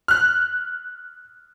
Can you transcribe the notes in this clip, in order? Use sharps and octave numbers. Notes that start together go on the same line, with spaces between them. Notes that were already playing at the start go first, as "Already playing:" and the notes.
F6 F#6